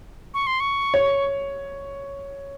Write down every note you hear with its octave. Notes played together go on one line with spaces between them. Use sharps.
C#6
C6
C#6
C#5